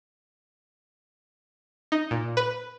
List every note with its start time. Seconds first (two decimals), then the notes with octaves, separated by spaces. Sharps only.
1.92 D#4
2.11 A#2
2.37 B4